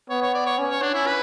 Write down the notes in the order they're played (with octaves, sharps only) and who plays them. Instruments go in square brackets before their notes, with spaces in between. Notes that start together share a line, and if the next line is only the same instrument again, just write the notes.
[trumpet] B3 [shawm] C#5
[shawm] C#5
D5
C#5
[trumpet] C#4
[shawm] C#5
D4
E4
B4